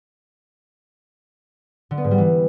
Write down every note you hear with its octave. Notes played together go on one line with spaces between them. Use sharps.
D3
B3
G#2
G3
E3